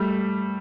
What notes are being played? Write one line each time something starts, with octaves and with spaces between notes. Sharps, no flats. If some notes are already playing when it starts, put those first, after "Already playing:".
Already playing: G3 A3